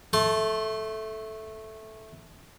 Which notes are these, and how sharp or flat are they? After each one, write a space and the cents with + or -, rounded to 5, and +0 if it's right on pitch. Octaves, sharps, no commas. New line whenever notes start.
A3 -5 C6 +40